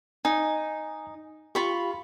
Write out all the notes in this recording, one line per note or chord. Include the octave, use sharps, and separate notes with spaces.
D#4 G#5
F4 G4 B5 C#6